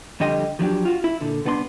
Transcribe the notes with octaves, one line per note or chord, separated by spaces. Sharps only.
F2 D3 G3 D#5 G5 C6
F3 F#3 D4 G4
F4 F#4
E4
A#2 D3
C2 B3 D4 A#5 C6